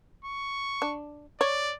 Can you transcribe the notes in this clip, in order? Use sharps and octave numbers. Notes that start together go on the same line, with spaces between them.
C#6
D4
C#5 D5